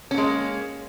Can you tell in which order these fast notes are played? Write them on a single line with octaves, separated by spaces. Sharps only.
C#4 A#3 G#3